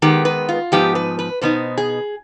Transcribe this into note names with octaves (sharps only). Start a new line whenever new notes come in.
D#3 G#3 B3 G4
B4
F4
G#2 F3 B3 D#4 G4
B4
B4
B2 B3 D#4 C5
G#4